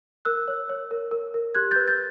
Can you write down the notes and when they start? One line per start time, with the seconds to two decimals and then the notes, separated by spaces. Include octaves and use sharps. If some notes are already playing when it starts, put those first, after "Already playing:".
0.25 A#4 E6 F#6
0.48 C#5
0.69 C#5
0.91 A#4
1.11 A#4
1.34 A#4
1.55 G4 F#6 G#6
1.71 B4 G6 A6
1.88 G6 A6